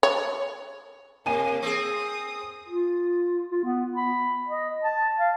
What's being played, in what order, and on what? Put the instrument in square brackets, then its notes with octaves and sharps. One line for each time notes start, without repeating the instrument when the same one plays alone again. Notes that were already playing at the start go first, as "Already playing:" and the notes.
[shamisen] C#5
[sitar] C3 [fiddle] A#3 [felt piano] G#5 D#7
[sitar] C4 G#4 [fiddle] D#6
[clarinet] F4
F4
B3
B5
D#5
A5
F5